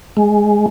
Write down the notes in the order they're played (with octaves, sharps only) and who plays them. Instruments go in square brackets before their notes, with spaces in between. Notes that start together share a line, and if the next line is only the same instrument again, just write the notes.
[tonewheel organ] G#3